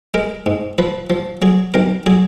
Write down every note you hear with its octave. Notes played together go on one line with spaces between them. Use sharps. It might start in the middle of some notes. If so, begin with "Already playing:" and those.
G#3 A#4
G#2
F3 B4
F3
F#3 G#4
B1 A#4
F#3 G#4